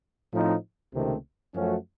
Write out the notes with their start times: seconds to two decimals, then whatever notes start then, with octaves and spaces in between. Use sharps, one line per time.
0.33 A2 F3 C4 D#4
0.93 C#2 C3 D#3 A3 C4
1.54 F#2 F3 A3 C#4 F#4